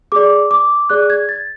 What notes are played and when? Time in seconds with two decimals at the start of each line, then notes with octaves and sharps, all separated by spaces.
0.12 G#4 D5 D6
0.51 D6
0.90 G#4 D5 F#6
1.10 G#6
1.29 A6